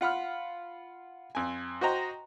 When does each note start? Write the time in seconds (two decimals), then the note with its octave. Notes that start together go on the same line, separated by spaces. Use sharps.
0.01 F4 F#5 B5 F6
1.35 F2 G#5
1.81 F#4 C5 D#5 G5 A#5